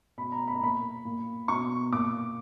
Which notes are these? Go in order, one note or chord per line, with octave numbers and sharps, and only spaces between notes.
B2 B5
A#5
B5
A#5
A#2 B5
A#2
B2 C#6
A#2 D6